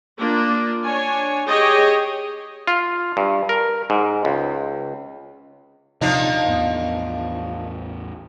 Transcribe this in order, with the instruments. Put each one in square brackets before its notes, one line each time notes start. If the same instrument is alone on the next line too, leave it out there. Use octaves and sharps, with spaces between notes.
[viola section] A#3 D4 F4
D4 C#5 G#5
G4 G#4 C#5 D#5 G5
[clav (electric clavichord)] F4
G2
A#4
G#2
C#2
[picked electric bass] D#1 C3 [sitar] F3 D4 D#4
[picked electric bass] A1 E2 B3